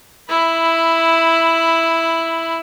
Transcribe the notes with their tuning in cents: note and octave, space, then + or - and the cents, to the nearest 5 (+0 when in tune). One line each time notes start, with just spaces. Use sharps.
E4 +0 B5 +10